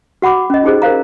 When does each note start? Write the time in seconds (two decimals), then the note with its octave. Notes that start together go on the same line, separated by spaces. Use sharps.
0.22 F#4 F#5 B5 D6
0.50 C#4 D#5
0.64 D#4 E4 G4 G#4 C5
0.82 A#4 C5 F5 A#5